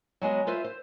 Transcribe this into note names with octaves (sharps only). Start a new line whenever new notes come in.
F#3 G#3 B3 F#4
F4 B4 C5 E5
C5